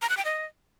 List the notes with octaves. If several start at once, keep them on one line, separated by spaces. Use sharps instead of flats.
A#5
F#6
G5
D#5